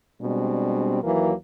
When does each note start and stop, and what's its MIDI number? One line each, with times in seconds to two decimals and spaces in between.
0.21 1.00 47
0.21 1.00 55
0.21 1.00 56
0.21 1.00 60
0.21 1.00 62
1.02 1.32 39
1.02 1.32 52
1.02 1.32 54
1.02 1.32 58